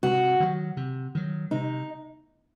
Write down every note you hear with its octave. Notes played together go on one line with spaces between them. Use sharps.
C3 F#4
D#3 F#3
C3
D#3 F#3
C3 D#4